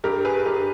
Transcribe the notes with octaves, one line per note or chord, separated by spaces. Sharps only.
G2 G4 A#4
G#4 B4
G2 G4 A#4